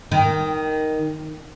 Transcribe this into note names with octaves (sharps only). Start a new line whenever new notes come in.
D#3